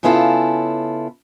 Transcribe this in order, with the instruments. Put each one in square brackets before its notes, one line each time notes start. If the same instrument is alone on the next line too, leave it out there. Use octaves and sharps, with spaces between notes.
[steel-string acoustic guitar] C#3 B3 C#4 E4 F4 A4